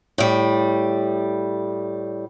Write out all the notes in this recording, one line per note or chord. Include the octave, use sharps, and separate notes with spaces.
A2 G3